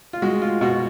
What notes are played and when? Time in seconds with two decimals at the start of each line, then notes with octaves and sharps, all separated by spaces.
0.13 F4
0.22 G#3 F#4
0.42 F4
0.61 B2 F#4